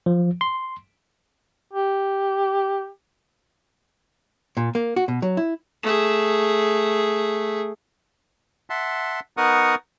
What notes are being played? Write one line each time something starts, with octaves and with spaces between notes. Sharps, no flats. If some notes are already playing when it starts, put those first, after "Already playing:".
F3
C6
G4
A#2
A#3
F#4
B2
F#3
E4
A3 G#4
E5 F#5 A5 C6
B3 D#4 A#4 F#5 C#6 D#6